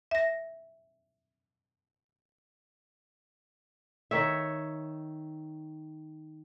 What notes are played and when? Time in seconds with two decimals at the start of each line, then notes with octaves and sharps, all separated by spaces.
0.11 E5 A#6
4.11 D#3 C#5 E5